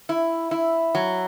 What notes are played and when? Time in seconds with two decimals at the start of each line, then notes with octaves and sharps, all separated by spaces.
0.09 E4
0.51 E4
0.95 F#3